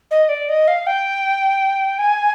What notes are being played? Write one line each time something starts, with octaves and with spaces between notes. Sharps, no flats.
D#5
D5
D#5
F5
G5
G#5